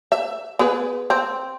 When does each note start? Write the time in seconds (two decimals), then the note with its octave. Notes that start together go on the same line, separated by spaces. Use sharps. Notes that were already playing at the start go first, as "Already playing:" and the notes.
0.12 E5
0.59 B3 G#4 B4
1.10 C4